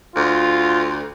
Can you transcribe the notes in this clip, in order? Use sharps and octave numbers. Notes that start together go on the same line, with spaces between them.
D2 F4